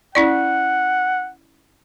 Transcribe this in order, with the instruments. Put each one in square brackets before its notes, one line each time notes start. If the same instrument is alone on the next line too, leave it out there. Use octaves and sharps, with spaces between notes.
[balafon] C#4 E4 D5 [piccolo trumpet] F#5